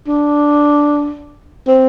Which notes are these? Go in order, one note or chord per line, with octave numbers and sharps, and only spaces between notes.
D4
C4